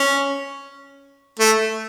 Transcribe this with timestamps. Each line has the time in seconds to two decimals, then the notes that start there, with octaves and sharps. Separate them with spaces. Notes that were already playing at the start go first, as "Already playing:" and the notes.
Already playing: C#4
1.39 A3